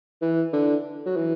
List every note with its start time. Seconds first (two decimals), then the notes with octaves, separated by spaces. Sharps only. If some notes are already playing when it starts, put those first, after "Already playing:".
0.22 E3
0.53 D3
1.06 F#3
1.16 E3